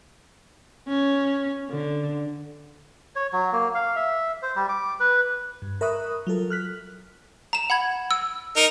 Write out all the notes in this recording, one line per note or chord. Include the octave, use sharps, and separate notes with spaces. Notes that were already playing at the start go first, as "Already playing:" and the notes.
C#4
D3
C#5
F#3
A#3
F5
E5
C5
G3
D6
B4
G2
A#4 E5 B5 C#6 D#6 F#6
F#3 F4 A4 A#4
F6 F#6 B6
A#5 E7
F#5 B5 G#6
E6
D#4 A#4